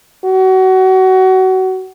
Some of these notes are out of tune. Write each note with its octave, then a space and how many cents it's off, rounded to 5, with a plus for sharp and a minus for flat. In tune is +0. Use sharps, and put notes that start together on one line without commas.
F#4 +25